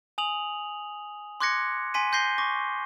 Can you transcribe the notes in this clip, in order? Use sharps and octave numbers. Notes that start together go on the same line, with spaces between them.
G#5 D#6 F7 F#7
C6 D6 F#6 G#6 A#6 C#7
G#5 C6 B6 D#7
C6 G6 A#6 C7 G7
C#6 D6 A#6